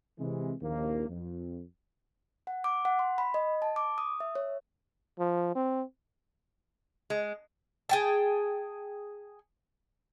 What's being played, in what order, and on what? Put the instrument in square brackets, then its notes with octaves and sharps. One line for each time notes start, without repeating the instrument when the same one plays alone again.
[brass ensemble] C3 E3 G#3
A#1 D#2 F3 A#3
F2
[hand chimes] F#5
D6
F#5
C6
B5
D#5
A5
D6
D#6
E5
C#5
[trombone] F3
C4
[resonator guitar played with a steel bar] G#3
[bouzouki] G#4 G5 A5